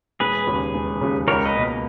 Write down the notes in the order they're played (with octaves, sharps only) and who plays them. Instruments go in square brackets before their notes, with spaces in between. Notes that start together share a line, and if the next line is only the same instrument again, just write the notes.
[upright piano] E1 [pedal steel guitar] G#4 B4
[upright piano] D#2 C#3
E1
D#2 C#3
[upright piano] C#2 [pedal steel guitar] A#4 C#5
[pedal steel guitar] B4 D#5
[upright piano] B2 A#3